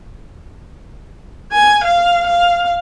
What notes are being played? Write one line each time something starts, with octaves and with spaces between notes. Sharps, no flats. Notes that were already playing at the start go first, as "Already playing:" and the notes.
G#5
F5
F5